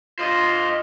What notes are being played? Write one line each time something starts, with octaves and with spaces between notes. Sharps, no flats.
F4 C5 D#5